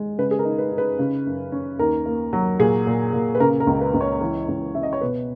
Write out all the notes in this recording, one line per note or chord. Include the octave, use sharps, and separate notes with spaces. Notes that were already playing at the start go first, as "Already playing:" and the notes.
Already playing: G#3
C#3 B4
G#4
A#4
D#4
B4
D#4
B4
C#3
F#2
C#4
D#2 A#4
A#3
F#3
A#2 G#4
A#2
A#2
B4
C#3 A#4
A#4
C#2
B4
C#2
C#5
E3
C#2
C#3 E5
D#5
C#5
B2 B4